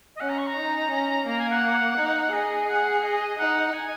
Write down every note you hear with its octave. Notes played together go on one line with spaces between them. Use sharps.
D#5
C#4 F#5
A#5
C#6
A#5
D#4
C#4
A#3 A#5
G#5
F#5
D#4
G#4 D#5
D#5
F#5
D#5
D#4 F#5
G#5